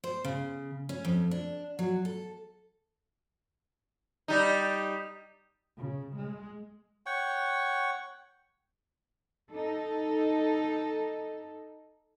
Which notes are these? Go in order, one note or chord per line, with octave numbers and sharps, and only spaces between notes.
C5
C#3
C#4
F2
D4
F#3
A4
G3 D#4
C#3
G#3
C#5 F#5 G5 C#6
D#4 A4